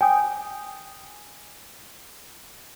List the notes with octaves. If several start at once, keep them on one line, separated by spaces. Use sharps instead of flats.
G5 G#5 D#6